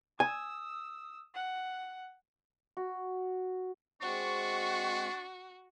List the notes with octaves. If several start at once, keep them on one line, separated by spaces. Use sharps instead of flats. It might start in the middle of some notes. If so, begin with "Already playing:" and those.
G#5 D#6 E6
F#5
F#4
G#3 C4 D4 F#4 C#6